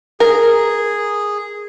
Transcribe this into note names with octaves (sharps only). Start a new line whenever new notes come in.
G#4 A#4